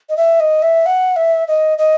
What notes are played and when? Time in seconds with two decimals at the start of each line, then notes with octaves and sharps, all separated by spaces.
0.09 D#5
0.17 E5
0.40 D#5
0.62 E5
0.86 F#5
1.16 E5
1.48 D#5
1.78 D#5